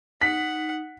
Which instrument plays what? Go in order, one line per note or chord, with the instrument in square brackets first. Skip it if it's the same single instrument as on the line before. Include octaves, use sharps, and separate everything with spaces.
[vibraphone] D#4 [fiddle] F#5 [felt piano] B6